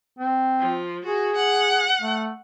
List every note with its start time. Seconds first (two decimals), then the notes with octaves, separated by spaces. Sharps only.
0.19 C4
0.59 F3
1.05 F#4 G#4
1.36 F#5
2.01 A3